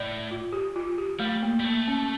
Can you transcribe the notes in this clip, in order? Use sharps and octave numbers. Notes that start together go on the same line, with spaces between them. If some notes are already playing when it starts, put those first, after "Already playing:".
Already playing: A2 D5
F4
G4
F4
G4
G3 A3
A#3
G3
A3 A#3
C#4